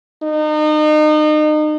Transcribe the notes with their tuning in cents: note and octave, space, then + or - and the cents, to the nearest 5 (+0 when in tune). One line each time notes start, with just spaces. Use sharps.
D#4 -35